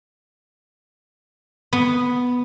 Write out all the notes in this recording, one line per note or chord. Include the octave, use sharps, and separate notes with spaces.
B3